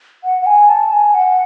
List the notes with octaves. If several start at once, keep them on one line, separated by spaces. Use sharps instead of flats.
F#5
F#5
G#5
A5
G#5
F#5